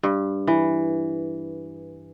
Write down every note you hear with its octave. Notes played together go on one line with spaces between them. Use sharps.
G2
E3